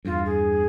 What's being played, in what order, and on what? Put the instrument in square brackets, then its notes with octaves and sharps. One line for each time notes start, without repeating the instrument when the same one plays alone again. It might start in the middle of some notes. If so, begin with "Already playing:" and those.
[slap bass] E2 G2 [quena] F4
[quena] G#4